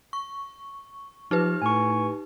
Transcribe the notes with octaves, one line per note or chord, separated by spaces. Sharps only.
C#6
F3 D#4 G4 B4 F6
A2 G#5 C#6